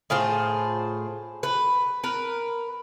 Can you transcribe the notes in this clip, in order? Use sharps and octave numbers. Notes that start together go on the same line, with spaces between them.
A2 F4 G#4 C5
B4
A#4 B4